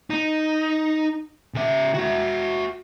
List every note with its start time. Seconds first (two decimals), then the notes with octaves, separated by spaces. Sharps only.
0.10 D#4
1.54 C#3 E5
1.94 F#4 E5